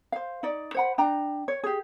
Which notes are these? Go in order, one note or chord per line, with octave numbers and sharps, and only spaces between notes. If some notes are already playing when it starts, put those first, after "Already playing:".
C5 F5
D#4 D5
C5 F#5 B5
D4 G5 A#5
C#5
G4 G#4